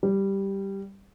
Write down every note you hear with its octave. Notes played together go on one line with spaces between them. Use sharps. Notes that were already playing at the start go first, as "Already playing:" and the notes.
G3